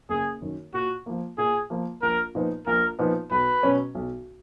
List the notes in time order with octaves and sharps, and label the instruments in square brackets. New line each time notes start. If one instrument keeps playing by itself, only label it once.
[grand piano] F#1 [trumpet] G#4
[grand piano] F#2 D#3
[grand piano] A#2 [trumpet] F#4
[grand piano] F3 A#3
[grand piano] A#2 [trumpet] G#4
[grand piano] F3 A#3
[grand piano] A#1 [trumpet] A#4
[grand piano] A#2 F3 B3 D#4
[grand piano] A#1 [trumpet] A#4
[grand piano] A#2 F3 B3 D#4
[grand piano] B1 [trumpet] B4
[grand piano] B2 F#3 C#4
B1